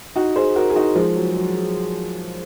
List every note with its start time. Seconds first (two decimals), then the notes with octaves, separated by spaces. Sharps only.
0.16 D#4 F#4
0.36 G#4 C5
0.56 F#4 A#4
0.70 G#4
0.76 D#4 F#4
0.95 F3 G#3
1.15 F#3
1.36 F#3